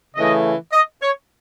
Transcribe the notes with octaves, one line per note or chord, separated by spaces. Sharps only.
C#3 E3 A3 D#5
D#5
C#5